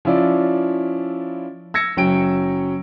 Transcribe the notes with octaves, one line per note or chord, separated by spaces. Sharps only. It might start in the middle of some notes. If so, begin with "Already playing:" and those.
F3 C#4 E4 F4 D5
E6 G#6 A#6 C#7
F#1 F#3 C#4 G5 D7